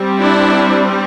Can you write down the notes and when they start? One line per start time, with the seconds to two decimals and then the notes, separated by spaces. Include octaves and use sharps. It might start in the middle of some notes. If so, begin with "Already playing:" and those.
Already playing: G3 C4
0.20 D4 E4